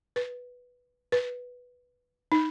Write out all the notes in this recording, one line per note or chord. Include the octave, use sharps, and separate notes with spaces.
B4
B4
D#4